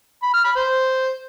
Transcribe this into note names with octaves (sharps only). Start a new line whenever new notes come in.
B5
F6
B5
C5